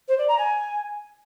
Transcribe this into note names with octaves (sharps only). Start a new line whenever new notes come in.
C5
D5
A#5
G#5